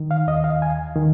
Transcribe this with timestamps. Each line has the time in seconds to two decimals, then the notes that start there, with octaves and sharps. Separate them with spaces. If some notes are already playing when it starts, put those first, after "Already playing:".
Already playing: D#3
0.11 F5
0.27 D#2 D#5
0.44 F5
0.62 D#2 G#5
0.96 D#3